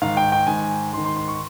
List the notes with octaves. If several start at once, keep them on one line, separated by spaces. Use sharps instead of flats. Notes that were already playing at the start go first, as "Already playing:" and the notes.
G#2 D#3 F5
G5
G5
G#2 D#3 G#5
G#2 D#3 C6
C6
C6
C#6